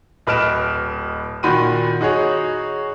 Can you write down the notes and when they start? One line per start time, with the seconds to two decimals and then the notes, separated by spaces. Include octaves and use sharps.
0.27 D1 B4 D#5 F6 D7 E7
1.43 A#2 D#3 F#4 B5 C6 D#7
2.01 D#4 F#4 G#4 C#5